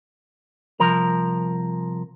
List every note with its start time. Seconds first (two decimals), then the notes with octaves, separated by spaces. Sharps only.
0.80 C2 F3 A#4 A#5